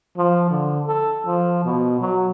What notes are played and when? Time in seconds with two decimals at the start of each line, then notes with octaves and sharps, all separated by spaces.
0.17 F3
0.50 D3
0.86 A4
1.26 F3
1.65 B2
2.01 F#3